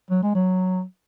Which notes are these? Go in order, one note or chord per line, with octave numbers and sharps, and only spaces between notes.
F#3
G#3
F#3